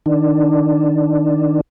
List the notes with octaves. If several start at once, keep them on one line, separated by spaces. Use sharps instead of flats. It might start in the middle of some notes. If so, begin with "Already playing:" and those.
D#3 D4